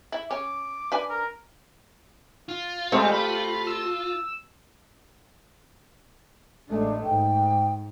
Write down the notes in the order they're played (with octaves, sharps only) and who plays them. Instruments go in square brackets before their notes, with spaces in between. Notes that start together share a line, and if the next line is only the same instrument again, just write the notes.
[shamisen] E4
[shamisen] C#4 [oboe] D6
[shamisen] D4 B4 G#5
[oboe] A#4
[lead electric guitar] F4
[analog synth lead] G#3 [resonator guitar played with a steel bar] A3 C4 G4
[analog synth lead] B5
E6
[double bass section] A1 G#3 A3 [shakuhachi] D4
[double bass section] G#2 [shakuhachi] G5